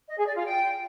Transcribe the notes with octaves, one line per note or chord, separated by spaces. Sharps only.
D#5
G#4
D5
F4
G5